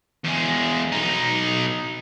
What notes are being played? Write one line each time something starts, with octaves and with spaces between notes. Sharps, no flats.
E2 G#3
B1 D#4